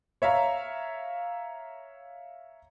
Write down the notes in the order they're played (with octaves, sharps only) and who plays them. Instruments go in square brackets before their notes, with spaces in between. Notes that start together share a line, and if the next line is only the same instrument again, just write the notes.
[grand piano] C#5 E5 F5 A#5